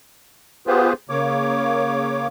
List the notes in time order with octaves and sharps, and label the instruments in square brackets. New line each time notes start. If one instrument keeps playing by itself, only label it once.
[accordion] B3 F4 G4 G#4 B4 C5
C#3 A#3 C#5 D6